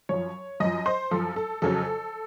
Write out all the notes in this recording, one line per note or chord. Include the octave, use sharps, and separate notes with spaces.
F#2 F3 C#5
F#2 F3 D#5
C5
F#2 F3 A4
A4
F2 C#3 F#3 A4